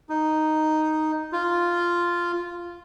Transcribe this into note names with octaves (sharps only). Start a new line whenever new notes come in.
D#4
F4